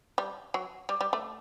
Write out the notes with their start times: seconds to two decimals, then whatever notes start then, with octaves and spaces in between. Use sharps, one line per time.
0.18 G3
0.54 F#3
0.89 G3
1.01 G3
1.13 A3